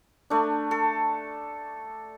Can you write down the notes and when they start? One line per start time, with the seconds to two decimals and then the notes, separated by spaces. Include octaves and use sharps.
0.30 A3 D4
0.71 A4